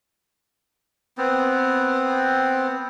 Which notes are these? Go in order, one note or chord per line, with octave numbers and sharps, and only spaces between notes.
B3 C4